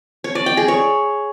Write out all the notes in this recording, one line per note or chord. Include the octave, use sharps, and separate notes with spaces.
C#5
D5
G5
G#4
C#5